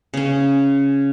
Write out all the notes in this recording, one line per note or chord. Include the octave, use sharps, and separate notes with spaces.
C#3 C#4